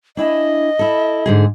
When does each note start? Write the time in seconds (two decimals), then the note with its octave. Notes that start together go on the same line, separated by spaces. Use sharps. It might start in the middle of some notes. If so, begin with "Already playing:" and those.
0.17 D4 E4 D#5 G#5
0.79 E4 A4
1.26 G#2 D3 G#4